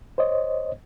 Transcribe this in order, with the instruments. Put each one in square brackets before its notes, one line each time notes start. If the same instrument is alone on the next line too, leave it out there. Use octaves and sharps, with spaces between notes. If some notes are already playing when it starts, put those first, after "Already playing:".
[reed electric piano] C5 C#5 D#5